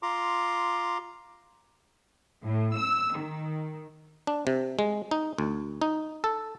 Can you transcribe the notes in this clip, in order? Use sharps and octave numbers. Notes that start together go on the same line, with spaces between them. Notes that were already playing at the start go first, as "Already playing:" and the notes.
F4 A#5 C6 D6
A2
E6
D#3
D4
C3
G#3
D#4
D2
D#4
A4